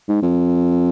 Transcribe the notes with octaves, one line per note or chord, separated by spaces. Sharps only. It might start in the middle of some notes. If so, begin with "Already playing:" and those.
G#2
F2